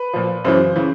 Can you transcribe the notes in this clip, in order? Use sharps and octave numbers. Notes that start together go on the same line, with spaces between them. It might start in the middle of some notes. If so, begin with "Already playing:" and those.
Already playing: B4
A#2 F3
F#2 C#3 E3 C5
C#3 E3